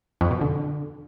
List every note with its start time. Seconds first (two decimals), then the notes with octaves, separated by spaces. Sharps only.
0.21 F2
0.31 B2
0.41 D3